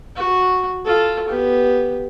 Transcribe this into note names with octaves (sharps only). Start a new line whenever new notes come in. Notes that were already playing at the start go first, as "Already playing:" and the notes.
F#4
F4 A4
B3 G4